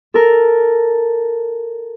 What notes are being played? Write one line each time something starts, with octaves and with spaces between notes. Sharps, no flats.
A4 A#4